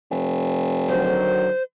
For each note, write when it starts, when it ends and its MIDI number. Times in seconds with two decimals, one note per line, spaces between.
0.11 1.29 29
0.88 1.48 50
0.88 1.48 51
0.88 1.48 54
0.88 1.63 72